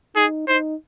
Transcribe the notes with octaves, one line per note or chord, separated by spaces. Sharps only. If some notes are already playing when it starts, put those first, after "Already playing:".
D#4 G#4
D#4 C5